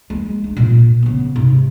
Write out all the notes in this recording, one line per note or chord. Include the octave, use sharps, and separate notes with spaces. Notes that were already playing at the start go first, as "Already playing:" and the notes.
G#3 A#3
D4
A#2
C#3 B3
G#2 C3